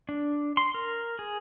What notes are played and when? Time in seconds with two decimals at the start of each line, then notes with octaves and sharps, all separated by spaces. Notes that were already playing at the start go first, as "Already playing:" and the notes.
0.09 D4
0.57 C6
0.74 A#4
1.19 G#4